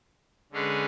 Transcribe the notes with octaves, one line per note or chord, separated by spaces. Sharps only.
D3 G#3 C#4 G#4 B4